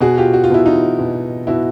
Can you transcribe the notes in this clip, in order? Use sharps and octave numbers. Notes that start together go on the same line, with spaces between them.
B2 F#4 G#4
F4 G4
F#4
F4
B2 E4
D#4 F4
B2
B2 E4 F#4